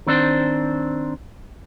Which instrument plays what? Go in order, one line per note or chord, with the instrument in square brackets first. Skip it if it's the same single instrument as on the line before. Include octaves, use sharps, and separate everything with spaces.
[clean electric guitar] D#3 C4 D4 C5